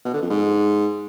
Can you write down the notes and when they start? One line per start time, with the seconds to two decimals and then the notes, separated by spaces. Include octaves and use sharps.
0.05 B2
0.13 D3
0.22 F2
0.30 G#2